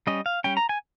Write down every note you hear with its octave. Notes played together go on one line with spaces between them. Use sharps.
G3 C#4 D#5
F5
G3 C#4 G5
A#5
G#5